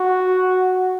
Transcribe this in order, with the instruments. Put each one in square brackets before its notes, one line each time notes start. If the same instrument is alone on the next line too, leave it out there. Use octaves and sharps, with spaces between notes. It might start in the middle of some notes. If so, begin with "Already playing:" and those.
Already playing: [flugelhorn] F#4